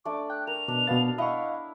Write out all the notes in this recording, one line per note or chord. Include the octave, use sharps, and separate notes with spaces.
A3 D4 D5 D6
G5 F#6
A#4 F7
B2 D4
B2 B3 F5 A6
E4 D#5 F5 F#5 C#6